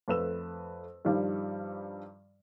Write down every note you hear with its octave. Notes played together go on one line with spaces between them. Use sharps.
F2 A3 B4 E6 E7
G2 D#3 F3 G3